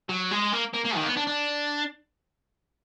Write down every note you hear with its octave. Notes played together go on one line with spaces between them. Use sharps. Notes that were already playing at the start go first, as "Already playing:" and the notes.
F#3
G#3
A#3
A#3
A#3
D#3
A#3
B3
D4
D4